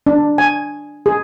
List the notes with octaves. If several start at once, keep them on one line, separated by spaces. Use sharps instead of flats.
D4
G#5
G#4